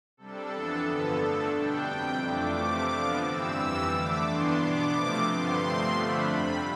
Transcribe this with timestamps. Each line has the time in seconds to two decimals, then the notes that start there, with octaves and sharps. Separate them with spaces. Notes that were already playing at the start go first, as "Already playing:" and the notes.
0.17 C3 G3 D4 A4
0.51 F2 E3 B3 D4
0.85 G2 D3 F3 B3 A4
1.20 D3 A3 D4
1.53 B2 G3 D4 G5
1.87 F2 C3 G3
2.21 F2 E3 A3 D4 D6
2.55 C3 F3 A3 C4
2.89 D3 F3 B3 D4
3.23 G2 E3 G3 C4 E6
3.57 F2 E3 G3
3.91 D3 A3 D4 D6
4.25 G2 E3 B3 D4 C6
4.59 B2 B3 D4 D6
4.93 C3 F3 A3 C4
5.27 G2 D3 G3 B3 C6
5.60 C3 F3 A3 C4
5.95 D3 F3 A3 D4 B5
6.29 F2 C3 G3 B5